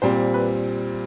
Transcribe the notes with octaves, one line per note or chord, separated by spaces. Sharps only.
A#2 G3 C4 C5
B4